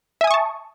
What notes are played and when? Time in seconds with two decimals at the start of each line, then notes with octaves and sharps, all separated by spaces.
0.21 E5
0.24 G#5
0.27 D#6
0.31 C#6
0.34 A5